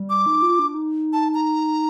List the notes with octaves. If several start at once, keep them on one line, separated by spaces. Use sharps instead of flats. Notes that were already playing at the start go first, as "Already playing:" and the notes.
Already playing: G3
D6
D#4
F4
D4
D#4
A5
A#5